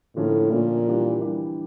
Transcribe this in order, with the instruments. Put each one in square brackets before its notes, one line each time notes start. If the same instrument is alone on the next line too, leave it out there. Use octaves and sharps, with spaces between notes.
[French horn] A2 [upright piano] D3 F3 A#3 C#4
[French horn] A#2 [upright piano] D3 F3 A#3 C#4
[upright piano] E3 G3 D4 G4
E3 G3 D4 G4